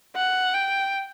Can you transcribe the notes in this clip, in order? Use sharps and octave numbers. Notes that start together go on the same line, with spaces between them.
F#5
G5